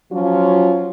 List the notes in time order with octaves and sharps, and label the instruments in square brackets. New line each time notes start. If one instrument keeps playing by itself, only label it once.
[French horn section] F3 F#3 C#4 F4